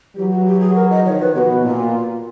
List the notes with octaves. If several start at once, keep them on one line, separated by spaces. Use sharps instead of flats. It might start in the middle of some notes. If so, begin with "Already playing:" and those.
E3 F#3 G4
F#4
G4
G#4
A#4
D#5
D#3 F3 C#5
B4
B2 F#4 G4
A#2 F4